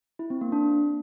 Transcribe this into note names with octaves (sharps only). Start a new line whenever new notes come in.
E4
C4
A#3
D4